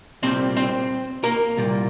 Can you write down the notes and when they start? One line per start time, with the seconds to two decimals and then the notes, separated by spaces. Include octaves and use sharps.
0.23 C2 A#2 G3 C4 C5
0.56 C4 C5
1.24 A#3 A#4
1.57 C2 A#2 G3